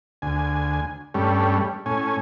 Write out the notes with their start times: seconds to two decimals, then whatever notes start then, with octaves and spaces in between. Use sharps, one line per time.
0.22 D2 G#5
1.14 G2 G3 A3 C#4
1.86 A2 C#4 G#5